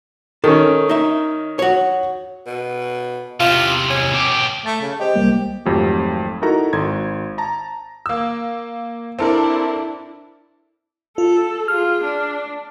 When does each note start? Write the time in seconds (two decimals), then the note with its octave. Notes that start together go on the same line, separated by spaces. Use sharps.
0.44 D#3 C#4 A4
0.89 D#4 E5
1.59 F#4 C#5
2.47 B2
3.40 E2 C3 F4
3.90 C#4
4.13 B2 G4
4.66 A3 A6
4.82 C#3
5.00 G4 C5 D#5
5.16 C2 G3 A#3
5.66 G#1 F2 F#3 A3 G4
6.42 D#4 E4 F#4 A4 A#4 A#5
6.73 G#1 C6 G#6
7.38 A5 A#5
8.06 A#3 E6
9.19 C4 D4 E4 A4 A#4
11.18 F4 A4
11.68 F4 G#4 F6
12.04 D4